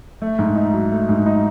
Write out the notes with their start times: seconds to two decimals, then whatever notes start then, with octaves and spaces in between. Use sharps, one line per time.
0.22 A3
0.39 G#2
0.56 D#4
0.73 F#3
0.91 A3
1.09 G#2
1.26 D#4